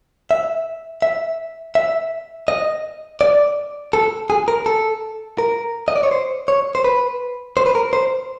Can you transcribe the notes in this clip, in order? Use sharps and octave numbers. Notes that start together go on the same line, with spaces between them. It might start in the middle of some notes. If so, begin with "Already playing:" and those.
E5
E5
E5
D#5
D5
A4
G#4
A#4
A4
A#4
D#5
D5
C#5
C5
C#5
C5
B4
C5
B4
A#4
C5